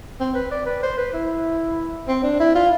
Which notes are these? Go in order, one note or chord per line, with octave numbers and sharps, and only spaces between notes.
C4
B4
D5
B4
C5
B4
E4
C4
D4
E4
F4